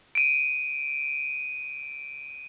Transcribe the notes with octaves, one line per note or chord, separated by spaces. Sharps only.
D7 D#7